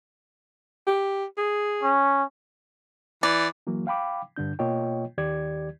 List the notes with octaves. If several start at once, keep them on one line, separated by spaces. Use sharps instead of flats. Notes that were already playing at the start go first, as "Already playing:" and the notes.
G4
G#4
C#4
E3 D5
E3 F#3 A#3
F5 G5 B5 D6
G2 D3 D4 G6
B2 A#3 F4 C#5 D#5 G5
D#2 D#3 G4 D5 G#6